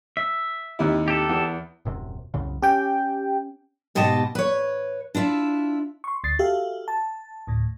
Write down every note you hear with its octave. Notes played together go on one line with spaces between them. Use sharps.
E5
D#2 C3 E4
G4 A4
E2
D#1 F#2 C3
C2 F#2 C#3
C#4 G4 G5
G#2 B2 G4 D#5 A5
B4 C#5
D4 E4 F4 E5
C6 C#6
D2 A6 C7
F#4 G4 A4 E5 F5
A5
D2 A2